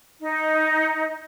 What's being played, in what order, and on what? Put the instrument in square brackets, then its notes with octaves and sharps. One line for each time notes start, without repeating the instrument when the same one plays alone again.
[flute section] D#4